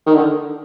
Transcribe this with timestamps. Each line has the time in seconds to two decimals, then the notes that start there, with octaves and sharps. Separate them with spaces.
0.06 D#3
0.15 D3